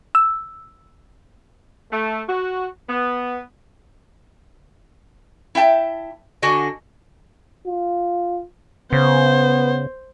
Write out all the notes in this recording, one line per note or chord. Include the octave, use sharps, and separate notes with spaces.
E6
A3
F#4
B3
E4 E5 G5 A5
D3 D4 F#4 D#5 G#5
F4
C#3 B3 C5